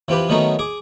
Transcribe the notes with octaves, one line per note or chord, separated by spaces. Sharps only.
E3 C4 F4 G4 B4
D#3 F#3 A3 B3 C#4 D#4
G#4 D6